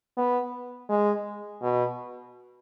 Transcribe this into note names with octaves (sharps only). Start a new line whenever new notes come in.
B3
G#3
B2